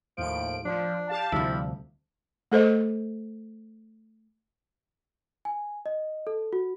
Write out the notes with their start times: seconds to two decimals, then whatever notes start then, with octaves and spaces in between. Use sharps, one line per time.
0.17 D#2 A2 F3 D7
0.65 F3 D4
1.08 G4 F5 A5
1.32 D2 C3 F3 G3 E4
2.52 A3 A4 C5 D#5
5.45 G#5
5.86 D#5
6.27 A4
6.53 F#4